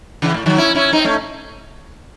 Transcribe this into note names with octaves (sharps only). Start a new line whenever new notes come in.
C#3 E3
A2
D#3 F#3
C#4 E4
C#4 E4
C4 D#4
A3 C#4